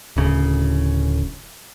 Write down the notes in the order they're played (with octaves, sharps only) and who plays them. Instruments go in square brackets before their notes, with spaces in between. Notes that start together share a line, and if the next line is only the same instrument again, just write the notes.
[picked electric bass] D1 C#3